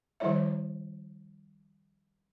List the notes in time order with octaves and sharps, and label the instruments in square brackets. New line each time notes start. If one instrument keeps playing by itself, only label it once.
[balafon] D#3 F3 G3 E4 C#5 E5